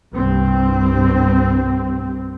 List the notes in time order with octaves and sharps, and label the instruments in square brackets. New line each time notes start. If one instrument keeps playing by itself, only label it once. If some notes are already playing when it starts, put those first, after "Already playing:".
[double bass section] C2 G2 C4